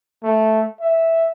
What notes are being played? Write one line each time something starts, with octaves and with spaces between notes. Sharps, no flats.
A3
E5